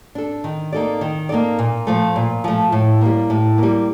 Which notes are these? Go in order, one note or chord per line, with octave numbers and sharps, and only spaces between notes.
D4 A4
D#3
A#3 D#4 A4 D5
D#3
A#3 D#4 A4 D5
A#2
F3 A3
A#2
F3 A3
A2
G3 A#3
A2
G3 A#3